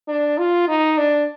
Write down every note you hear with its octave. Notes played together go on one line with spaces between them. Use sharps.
D4
F4
D#4
D4